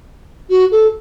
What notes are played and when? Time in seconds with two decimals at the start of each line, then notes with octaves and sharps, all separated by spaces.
0.49 F#4
0.71 A4